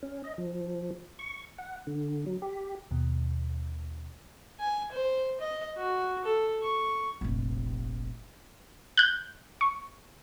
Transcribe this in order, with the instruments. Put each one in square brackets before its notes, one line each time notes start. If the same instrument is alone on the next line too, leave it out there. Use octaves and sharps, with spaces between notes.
[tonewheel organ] C#4
D#5
F3
C#6
F#5
D3
F#3
G4
[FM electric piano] D#2 B2
[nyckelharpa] G#5
C5
D#5
F#4
A4
C#6
[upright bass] F1 A#1
[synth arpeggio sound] F#6 G6
C#6